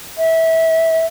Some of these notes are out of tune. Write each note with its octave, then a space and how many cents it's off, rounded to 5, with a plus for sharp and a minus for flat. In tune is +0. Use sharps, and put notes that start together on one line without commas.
E5 -20